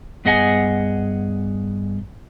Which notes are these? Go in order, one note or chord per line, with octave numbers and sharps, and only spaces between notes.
G2 B3 G#4 D#5 F#5 G#5